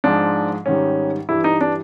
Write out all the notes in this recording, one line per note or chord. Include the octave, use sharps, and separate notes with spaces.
G#2 F3 G#3 D4
G#2 D#3 G3 C#4
G2 E3 G3 E4
D#4
D4